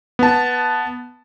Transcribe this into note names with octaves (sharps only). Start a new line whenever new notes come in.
B3 A5